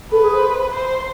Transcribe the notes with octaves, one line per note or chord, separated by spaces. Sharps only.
A4 B4
G#4
C5
C5